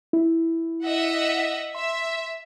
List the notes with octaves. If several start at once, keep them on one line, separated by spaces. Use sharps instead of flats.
E4
D#5 E5 F#5
E5 C6